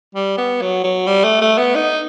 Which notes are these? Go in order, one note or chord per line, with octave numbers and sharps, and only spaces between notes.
G3
B3
F#3
F#3
G3
A3
A3
B3
D#4